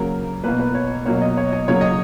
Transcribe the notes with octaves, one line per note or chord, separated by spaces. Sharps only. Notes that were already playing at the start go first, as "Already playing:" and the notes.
Already playing: C#3 F#3 A#3 A#4
B2 A#3 B4
B4
C#5
B2 F#3 A#3 C#5
D#5
C#5
D#5
C#3 F#3 A#3 C#5
D#5